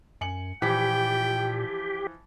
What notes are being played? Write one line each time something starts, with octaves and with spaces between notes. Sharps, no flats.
F#2 G#5 C#7 F#7
A#2 E3 F3 G4 G5 B6